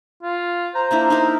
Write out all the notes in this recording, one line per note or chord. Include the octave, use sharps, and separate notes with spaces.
F4
C5 A#5
A#3 D4 E4
D#4 E4 A#4